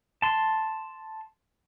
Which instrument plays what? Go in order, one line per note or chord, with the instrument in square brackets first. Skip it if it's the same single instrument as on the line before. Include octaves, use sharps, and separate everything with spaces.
[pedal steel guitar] A5 C6